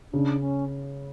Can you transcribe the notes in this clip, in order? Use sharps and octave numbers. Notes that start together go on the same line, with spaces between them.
C#3 D4
C#4